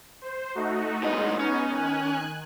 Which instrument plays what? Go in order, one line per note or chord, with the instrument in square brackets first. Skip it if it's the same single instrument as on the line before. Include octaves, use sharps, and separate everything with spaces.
[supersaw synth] C5
A3 D#4 F#4
[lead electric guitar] A2 D#5 [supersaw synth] G#3 B3 D#4
[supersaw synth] B3 D#4 [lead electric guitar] C#4
[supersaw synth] D#3 G#5 F#6